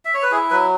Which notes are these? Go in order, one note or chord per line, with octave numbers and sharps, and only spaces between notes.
E5
C#5
B4
E4 G#4
F#3 B4